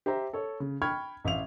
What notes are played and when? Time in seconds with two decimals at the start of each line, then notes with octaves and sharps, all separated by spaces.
0.06 G4 C5 E5 A#5
0.33 A4 C#5
0.60 C#3
0.82 G5 B5 C#6 F6 G#6
1.25 A1 E5 F5 F7